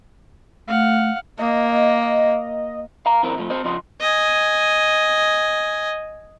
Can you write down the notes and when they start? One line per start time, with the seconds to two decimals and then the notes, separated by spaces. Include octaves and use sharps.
0.68 A3 F5 F#5
1.39 A#3 D#5
3.06 F5 A#5
3.23 F#2 E3 C4 A#4
3.36 C3 F3 A3
3.50 C4 C5 D#5
3.64 C#3 F3 D#5 C6
4.01 D#5 G#5